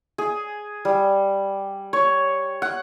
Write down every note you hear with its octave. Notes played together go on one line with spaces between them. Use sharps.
G#4
G3
C#5
F#5